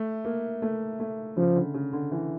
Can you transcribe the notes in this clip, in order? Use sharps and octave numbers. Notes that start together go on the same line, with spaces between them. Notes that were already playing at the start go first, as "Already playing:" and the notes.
Already playing: A3
A#3
A3
A3
C#3 F3
D3
C#3
D3
E3